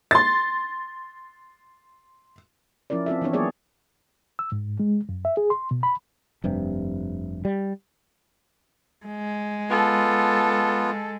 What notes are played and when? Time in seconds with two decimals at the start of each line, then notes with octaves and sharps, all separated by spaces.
0.11 C6 A6
2.90 F3 C#4 E4 A#4 D5
3.06 C4 F4 A4 E5
3.21 E3 B3 C4 D4 C#5
3.33 F#3 A#3 B3 G#4 C#5 D5
4.39 E6
4.52 G#2
4.80 G#3
5.09 F#2
5.25 E5
5.37 G#4
5.50 C6
5.71 B2
5.83 B5
6.44 F1 G2 C3
7.45 G3
9.06 G#3
9.70 B3 F4 A4